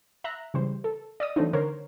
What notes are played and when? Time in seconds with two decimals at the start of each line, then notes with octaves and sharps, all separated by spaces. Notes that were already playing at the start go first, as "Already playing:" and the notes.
0.24 E5 A#5 F#6
0.54 C#3 E3 G3 C5
0.84 A4
1.20 D5 D#5 D#6
1.36 E3 F#3 A3 C4 D4 D#4
1.53 D3 A#4 C5 C#5